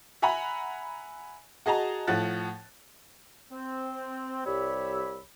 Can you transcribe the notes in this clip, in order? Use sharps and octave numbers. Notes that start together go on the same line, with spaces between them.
E5 F#5 G#5 A#5 B5
F#4 G#4 D#5 A5 A#5
A2 F3 F#5 F#6 A6
C4
C2 G3 G4 C#5 B5 E6